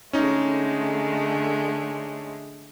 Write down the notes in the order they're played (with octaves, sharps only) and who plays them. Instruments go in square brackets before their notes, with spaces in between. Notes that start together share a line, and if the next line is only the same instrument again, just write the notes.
[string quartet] D3 G#3 A3 [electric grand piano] C#4 D#4